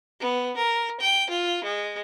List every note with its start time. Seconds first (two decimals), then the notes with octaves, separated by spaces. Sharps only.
0.20 B3
0.57 A#4
1.00 G5
1.30 F4
1.64 G#3